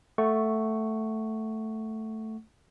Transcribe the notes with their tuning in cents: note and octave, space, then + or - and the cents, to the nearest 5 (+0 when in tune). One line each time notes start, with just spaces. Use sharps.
A3 +0 F#5 +0 C#6 +0